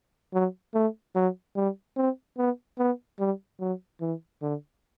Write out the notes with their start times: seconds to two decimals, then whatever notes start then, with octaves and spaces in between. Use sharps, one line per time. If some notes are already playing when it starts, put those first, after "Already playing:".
0.33 F#3
0.74 A3
1.15 F#3
1.56 G3
1.97 C4
2.38 B3
2.78 B3
3.19 G3
3.60 F#3
4.01 E3
4.42 D3